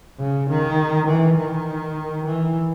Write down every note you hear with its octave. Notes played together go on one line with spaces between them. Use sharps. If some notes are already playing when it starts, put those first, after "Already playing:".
C#3
D#3
E3
D#3
E3